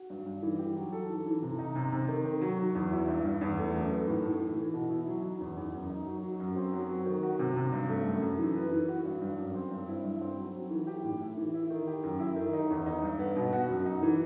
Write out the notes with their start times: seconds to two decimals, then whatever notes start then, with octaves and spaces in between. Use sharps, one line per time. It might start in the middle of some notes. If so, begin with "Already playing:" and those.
Already playing: F#4
0.10 G2
0.26 G2
0.43 E3
0.59 G4
0.76 F#3
0.92 A4
1.10 E3
1.26 E3
1.42 C3
1.59 D#4
1.75 C3
1.92 C3
2.08 D#3
2.25 D#3
2.42 F#3
2.59 F#3
2.75 E2
2.92 E4
3.08 G2
3.25 G2
3.41 E2
3.58 A3
3.75 F#2
3.91 B3
4.08 A2
4.24 A2
4.41 E3
4.57 E3
4.74 B2
4.91 E4
5.07 F#3
5.24 D#4
5.40 E2
5.57 E2
5.73 F#2
5.90 D#4
6.07 F#3
6.23 F#3
6.40 F#2
6.56 C4
6.73 F#3
6.89 F#3
7.06 D#3
7.23 F#4
7.39 C3
7.56 C3
7.73 G2
7.89 A3
8.05 F#2
8.22 F#2
8.38 E3
8.56 B4
8.72 E3
8.88 F#4
9.05 G2
9.22 G2
9.38 F#2
9.55 C4
9.71 G2
9.88 E4
10.04 G2
10.21 C4
10.37 F#3
10.54 F#3
10.71 E3
10.87 G4
11.04 A2
11.21 E4
11.37 E3
11.54 E4
11.70 D#3
11.87 G4
12.03 F#2
12.20 E4
12.36 D#3
12.53 D#4
12.70 E2
12.86 D#4
13.02 G2
13.19 B3
13.36 B2
13.53 F#4
13.69 F#2
13.86 D#4
14.03 E3